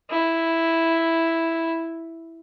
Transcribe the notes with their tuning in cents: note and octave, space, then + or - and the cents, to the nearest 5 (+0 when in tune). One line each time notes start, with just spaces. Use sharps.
E4 +0